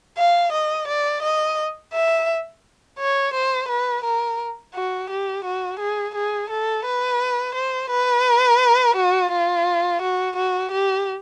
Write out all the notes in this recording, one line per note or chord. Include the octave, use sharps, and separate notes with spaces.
F5
D#5
D5
D#5
E5
C#5
C5
B4
A#4
F#4
G4
F#4
G#4
G#4
A4
B4
C5
B4
F#4
F4
F#4
F#4
G4